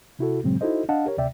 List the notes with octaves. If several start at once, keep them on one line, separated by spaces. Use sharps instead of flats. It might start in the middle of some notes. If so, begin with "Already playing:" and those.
C3 E4 F#4 A4
G2 A#2 C#3 F#3 G#3 C4
D#4 E4 F#4 A4 C5 D#5
D4 D#5 F5 F#5 A5
G4 A#4 C#5
D2 C3 D5 E5 G5